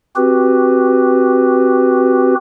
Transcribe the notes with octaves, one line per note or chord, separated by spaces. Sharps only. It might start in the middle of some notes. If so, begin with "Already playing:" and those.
C4 F#4 G4 B4